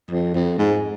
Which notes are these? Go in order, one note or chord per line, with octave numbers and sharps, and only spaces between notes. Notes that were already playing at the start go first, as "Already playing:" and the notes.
F2
F2
G#2